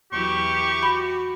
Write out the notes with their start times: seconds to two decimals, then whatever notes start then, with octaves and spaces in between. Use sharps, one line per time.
0.13 E2 F#3 E4 G4 C#6
0.83 F#4 B5